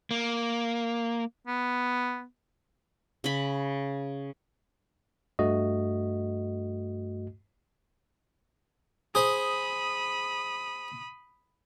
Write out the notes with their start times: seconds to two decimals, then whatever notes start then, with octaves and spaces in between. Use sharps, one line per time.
0.11 A#3
1.47 B3
3.24 C#3 B5
5.39 G2 A3 F#4 D#5
9.15 G#4 C5 B5 D#6